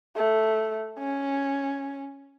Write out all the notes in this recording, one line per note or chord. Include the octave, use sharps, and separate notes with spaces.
A3
C#4